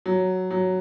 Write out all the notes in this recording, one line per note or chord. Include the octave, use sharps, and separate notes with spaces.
F#3
F#3